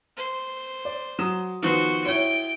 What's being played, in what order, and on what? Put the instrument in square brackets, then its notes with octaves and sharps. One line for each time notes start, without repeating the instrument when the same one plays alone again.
[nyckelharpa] C5
[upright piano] D5
F#3 D#6 E7
[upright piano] D#3 F3 B3 [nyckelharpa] F#4 C5
[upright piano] E4 C#5 [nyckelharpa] G5